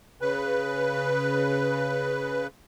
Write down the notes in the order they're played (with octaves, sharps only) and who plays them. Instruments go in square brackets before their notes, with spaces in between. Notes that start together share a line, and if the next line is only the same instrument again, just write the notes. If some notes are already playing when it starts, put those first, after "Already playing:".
[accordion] C#3 B4